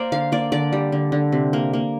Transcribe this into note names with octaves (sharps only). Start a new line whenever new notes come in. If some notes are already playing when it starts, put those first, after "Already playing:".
Already playing: A#3 A#4 C5 D5
D3 F5
A#3 D5
D3 D5
G3
D3
D3
C3
A#3
A#3